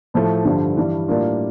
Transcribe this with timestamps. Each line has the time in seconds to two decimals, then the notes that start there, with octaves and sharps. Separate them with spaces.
0.14 A2 F3 A3
0.45 G2 D3 F3
0.77 G2 E3 G3 D4
1.08 A2 G3 A#3 D4 F4